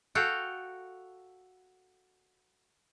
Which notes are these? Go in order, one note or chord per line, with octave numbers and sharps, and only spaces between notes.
F#4 A4 F5 G5